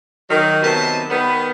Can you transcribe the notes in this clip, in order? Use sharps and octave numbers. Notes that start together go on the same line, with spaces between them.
D#3 F#3
C3 D#3 F#3 B3 A5
D#3 G3 B3